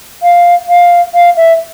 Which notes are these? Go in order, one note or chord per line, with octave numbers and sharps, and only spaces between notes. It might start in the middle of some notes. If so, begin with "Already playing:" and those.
F5
F5
F5
E5